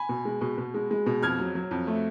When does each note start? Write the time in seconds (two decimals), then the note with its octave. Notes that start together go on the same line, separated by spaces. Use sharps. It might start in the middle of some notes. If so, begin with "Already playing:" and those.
Already playing: G#5 B5
0.09 B2
0.25 G#3
0.41 B2
0.58 B2
0.74 G#3
0.91 G#3
1.06 B2
1.23 F2 F6 G#6
1.39 F#3
1.55 F#3
1.71 F2
1.87 A3